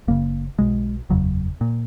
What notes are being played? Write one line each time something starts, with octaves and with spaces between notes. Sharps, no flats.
F#1 F#2 C#3 A#3
B1 B2 G#3
F#1 E2 C#3 F#3
A#2